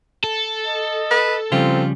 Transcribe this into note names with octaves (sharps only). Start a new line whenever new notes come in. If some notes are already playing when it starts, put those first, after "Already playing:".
A4
D#5
B4
C#3 F3 G3 C4 F4